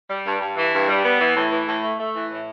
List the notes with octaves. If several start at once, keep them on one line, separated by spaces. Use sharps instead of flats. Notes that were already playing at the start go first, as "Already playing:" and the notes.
G3
G2
G2
E3
G2
G3
B3
E3
A2
E3
A2
A3
A3
E3
A2